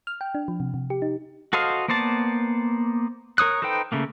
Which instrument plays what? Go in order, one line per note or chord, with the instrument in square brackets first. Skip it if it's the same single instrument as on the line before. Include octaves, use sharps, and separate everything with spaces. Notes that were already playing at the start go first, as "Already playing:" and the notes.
[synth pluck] F6
G5
D4
F3
C3
C3
G4
D#4
[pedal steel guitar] F#4 A4 C5 D#5 F5
A#3 B3 C5 D5 A5
A#4 C#5 D#6 F#6
D#4 A4 B4 C5 G5
C#3 A3 A#3